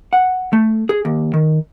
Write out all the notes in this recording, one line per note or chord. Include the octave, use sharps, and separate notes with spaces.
F#5
A3
G#4
D#2
D#3